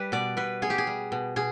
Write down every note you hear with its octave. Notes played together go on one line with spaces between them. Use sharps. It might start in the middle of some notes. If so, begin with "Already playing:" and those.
Already playing: G3 B4
B2 D5
B2 B4
B3 G#4
G4
G#4
G3
B2
B2 G#4